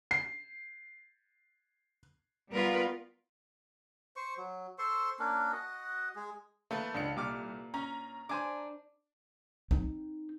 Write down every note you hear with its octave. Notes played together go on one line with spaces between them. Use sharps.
C7
G3 B3 F4 A#4 B4
C5 C#6
F#3
A4 C5 C6 C#6
A#3 C#4 D4
F#4 D#5 F#5
G#3 G#4
E3 A3 A#3 A4 B4
C#2 D4 F5 C#7
C2 A#2 D6 F6
C#4 A#5
D4 C5 G#5 D6
C4 D#4